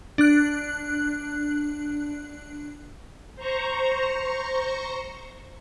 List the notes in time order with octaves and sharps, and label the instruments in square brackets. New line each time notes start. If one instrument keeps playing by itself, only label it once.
[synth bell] D4 F#6
[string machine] C5 A#5 C#6